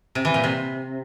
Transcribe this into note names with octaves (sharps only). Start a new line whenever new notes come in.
C3
E3
A#2
C3